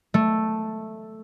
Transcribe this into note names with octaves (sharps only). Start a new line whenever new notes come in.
A3